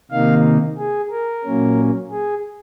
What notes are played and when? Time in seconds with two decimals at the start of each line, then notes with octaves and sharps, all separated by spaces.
0.11 C3 D#3 A#3 D#4 F5
0.78 G#4
1.10 A#4
1.44 A#2 F#3 A#3 C#4
2.11 G#4